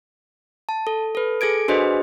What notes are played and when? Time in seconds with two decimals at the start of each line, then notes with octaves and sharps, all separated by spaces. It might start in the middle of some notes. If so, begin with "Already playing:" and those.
0.69 A5
0.87 A4
1.15 A4 B4
1.41 G#4 A4 G#6 D7
1.68 D4 F#4 G#4 B4 C5 D#5